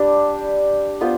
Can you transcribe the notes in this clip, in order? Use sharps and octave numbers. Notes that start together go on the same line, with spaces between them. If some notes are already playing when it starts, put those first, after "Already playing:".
Already playing: G3 D4 G4
B3 F4 C5 F5